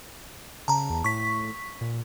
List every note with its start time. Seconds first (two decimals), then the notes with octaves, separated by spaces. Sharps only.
0.68 C#3 A5 A#5
0.90 E2
1.04 A2 C#6 B6
1.81 A#2